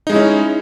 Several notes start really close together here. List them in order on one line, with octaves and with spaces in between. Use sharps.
D#4 G#3 E4 C#4